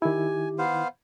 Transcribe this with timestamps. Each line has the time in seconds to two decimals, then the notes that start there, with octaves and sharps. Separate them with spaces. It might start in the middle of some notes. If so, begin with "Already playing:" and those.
0.02 D#3 E4 G4 G#5
0.58 B3 C5 F5